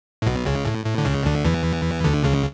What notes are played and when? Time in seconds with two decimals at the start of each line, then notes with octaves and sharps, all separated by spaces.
0.22 A2
0.26 B1 B2
0.46 C#2 C#3
0.65 A2
0.86 A2
0.98 D3
1.05 C#2 C#3
1.26 D2 D3
1.45 E2 E3
2.04 D2 D3
2.24 C#2 C#3